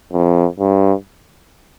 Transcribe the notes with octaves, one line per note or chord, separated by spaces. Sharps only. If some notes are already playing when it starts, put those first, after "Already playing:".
F2
G2